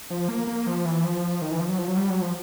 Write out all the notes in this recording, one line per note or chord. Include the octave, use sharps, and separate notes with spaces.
F3
A#3
A#3
F3
E3
F3
D#3
E3
F3
F#3
F3
F#3
G3
F#3
F3